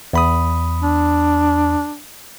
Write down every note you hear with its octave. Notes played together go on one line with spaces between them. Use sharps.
E2 B5 D#6
D4